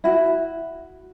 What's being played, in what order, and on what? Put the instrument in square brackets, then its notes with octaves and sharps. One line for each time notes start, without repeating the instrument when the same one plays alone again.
[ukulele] E4 F#4